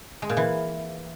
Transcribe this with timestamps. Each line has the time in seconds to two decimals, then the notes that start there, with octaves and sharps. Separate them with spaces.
0.22 G#3
0.29 A#2
0.37 E3